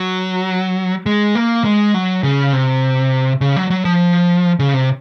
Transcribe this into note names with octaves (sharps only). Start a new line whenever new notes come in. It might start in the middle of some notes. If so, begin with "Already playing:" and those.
Already playing: F#3
G#3
A#3
G#3
F#3
C#3
C3
C#3
F#3
F#3
F3
C#3
C3